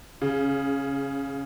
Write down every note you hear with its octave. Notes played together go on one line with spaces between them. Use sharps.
C#3